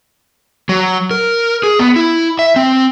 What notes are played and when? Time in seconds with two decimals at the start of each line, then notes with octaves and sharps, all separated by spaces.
0.69 F#3
1.11 A#4
1.63 G#4
1.79 B3
1.96 E4
2.39 E5
2.56 C4